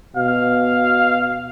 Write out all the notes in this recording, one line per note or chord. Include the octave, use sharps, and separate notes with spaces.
B2 F5